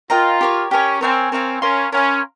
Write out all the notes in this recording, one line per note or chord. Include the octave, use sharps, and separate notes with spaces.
F4 A#4 D#5 G5 A#5
G4 A#4 C#5
C#4 G4 A#4 C#5
C4 A#4 C#5 F5 G#5
C4 A#4 C#5 F5 G#5
C#4 A#4 F5 C6
C#4 A#4 F5 C6